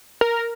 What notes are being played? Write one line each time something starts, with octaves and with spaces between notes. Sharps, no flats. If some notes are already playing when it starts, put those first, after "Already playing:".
A#4